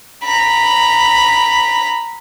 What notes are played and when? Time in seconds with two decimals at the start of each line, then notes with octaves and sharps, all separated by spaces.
0.24 A#5 B5